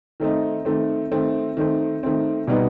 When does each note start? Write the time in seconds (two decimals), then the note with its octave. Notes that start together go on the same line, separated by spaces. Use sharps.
0.20 D#3 A3 C4 D#4
0.65 D#3 A3 C4
1.11 D#3 A3 C4
1.57 D#3 A3 C4
2.03 D#3 A3 C4
2.47 B2 G3 B3 D#4